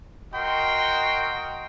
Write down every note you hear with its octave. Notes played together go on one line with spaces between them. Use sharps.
F#4 A#4 D#5 G5 C6